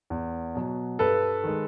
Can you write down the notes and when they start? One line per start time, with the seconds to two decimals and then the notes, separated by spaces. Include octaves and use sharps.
0.10 E2
0.55 B2 F#3
0.99 G2 A4 B4
1.44 D#3 G#3